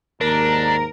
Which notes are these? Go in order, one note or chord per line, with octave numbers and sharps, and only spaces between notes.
D#2 G#2 D4 A#4 A#5